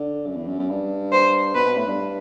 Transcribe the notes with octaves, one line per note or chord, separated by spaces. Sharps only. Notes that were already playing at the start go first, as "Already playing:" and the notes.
Already playing: D3
F#2
E2
F#2
F#2
G2
C5
B2 B4
B2
A2
G2